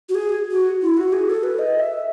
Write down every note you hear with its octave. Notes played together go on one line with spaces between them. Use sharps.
F#4
G#4
F#4
E4
F#4
G#4
A4
B4
D#5
E5